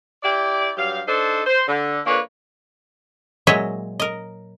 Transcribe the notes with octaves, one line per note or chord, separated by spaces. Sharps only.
E4 G4 D5
G2 F#3 G4 F5
D4 D#4 A4 C5
C5
D3
F2 A#3 D4 B4 C#5
A#2 F#3 G#3 C#5 D#5 E5
A#4 D#5